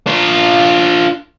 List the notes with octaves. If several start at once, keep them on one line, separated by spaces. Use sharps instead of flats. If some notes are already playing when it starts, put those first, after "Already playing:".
D4 F4